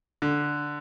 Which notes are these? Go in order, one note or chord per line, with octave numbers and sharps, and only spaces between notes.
D3